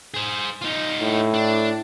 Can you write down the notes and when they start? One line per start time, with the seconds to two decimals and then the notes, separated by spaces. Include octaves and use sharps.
0.14 G#4 C5
0.62 D#4 F4
1.01 A2
1.34 D4